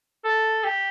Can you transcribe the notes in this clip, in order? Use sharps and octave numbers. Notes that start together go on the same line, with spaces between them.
A4
G4